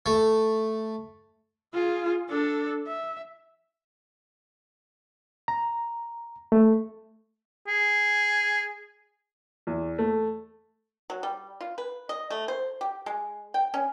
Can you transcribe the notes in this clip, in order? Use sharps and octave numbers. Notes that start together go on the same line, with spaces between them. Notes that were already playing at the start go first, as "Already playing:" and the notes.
A3
F4 G#4
D4 A4
E5
A#5
A3
G#4
E2
A3
F#3
G3
F4
B4
D#5
A3
C5
G4
G#3
G5
C#4